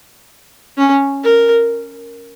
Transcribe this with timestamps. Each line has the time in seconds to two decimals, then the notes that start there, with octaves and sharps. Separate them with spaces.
0.78 C#4
1.24 A#4